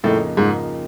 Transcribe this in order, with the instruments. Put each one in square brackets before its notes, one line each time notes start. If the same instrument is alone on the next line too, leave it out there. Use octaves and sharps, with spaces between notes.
[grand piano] F2 C#3 F3 A#3 D#4 [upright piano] A2
[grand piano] F2 C#3 F3 A#3 D#4 [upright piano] G#2